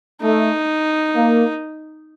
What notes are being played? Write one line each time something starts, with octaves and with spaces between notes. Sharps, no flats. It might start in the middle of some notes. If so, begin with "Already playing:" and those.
A3 D#4
A#3